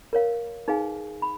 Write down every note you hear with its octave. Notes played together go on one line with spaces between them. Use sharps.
A#4 C#5 F5
D#4 G#4 B4 F5 G#5
B5